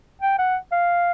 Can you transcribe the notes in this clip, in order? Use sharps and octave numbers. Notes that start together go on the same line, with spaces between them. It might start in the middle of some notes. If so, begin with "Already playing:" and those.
G5
F#5
F5